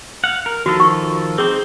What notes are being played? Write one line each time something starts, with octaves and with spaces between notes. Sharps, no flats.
F5 F#5
A#4
D#3 F3 F#4 A4
C#6
C4 D#4 G#4 C5 E6